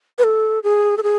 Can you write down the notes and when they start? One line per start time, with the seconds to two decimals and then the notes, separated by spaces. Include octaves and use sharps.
0.18 B4
0.24 A4
0.63 G#4
0.97 A4
1.03 G#4